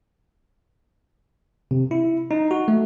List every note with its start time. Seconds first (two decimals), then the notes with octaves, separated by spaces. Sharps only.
1.71 C3
1.91 E4
2.31 D#4
2.51 F#4
2.68 A3